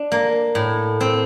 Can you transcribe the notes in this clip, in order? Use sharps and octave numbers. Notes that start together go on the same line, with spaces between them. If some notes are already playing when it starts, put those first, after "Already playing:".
Already playing: D4
A#3
A2
C4